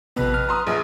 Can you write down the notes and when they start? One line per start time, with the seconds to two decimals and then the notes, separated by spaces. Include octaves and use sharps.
0.16 A1 F2 C3 B3 B4
0.34 F6
0.49 A#5 C6 D#6
0.67 A#1 G#4